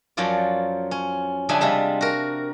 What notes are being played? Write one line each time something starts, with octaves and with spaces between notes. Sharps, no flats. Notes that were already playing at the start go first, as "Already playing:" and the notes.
F#2 F3 F#3 F4 D5
C#4
C#3 F3 G3 D4 E5 G#5
C3 G3 G#3 F4 E5
F#4 A#4